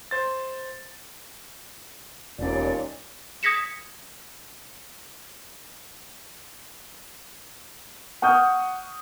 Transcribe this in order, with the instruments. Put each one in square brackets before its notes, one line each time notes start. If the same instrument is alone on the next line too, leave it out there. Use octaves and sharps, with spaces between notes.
[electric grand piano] C5 A6
[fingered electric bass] E1 C#4 [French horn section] D#2 A#2 [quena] D5
[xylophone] D#6 G#6 A#6 B6 C#7 E7
[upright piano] F#5 C#6 D#6 F6 G6